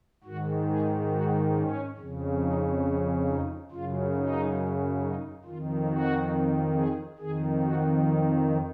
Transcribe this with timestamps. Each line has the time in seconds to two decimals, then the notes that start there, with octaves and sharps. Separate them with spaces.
0.24 G#2 D#3 F#4
0.68 G#4
1.11 F#4
1.55 C#4
1.98 F2 C#3
2.41 D#4
2.84 C#4
3.27 D#4
3.71 F#2 C#3 F4
4.15 D#4
5.01 D#4
5.45 F2 D#3 F4
5.88 F#4
6.75 G#4
7.18 F2 D#3 G#4
7.62 F#4
8.05 D#4